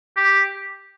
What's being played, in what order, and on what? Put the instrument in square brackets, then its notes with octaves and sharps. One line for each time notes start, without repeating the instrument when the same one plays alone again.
[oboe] G4